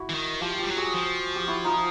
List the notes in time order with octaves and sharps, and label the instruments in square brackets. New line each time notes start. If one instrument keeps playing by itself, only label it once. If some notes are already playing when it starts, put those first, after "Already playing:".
Already playing: [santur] E4 F#4
[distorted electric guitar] E3
D#3
[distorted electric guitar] F3 [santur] F4 G4
[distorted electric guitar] G3 [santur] F4 G4
[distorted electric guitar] F#3
[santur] F#4 G#4
[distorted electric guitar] F3
[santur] G4
E4 F#4
D#4 F4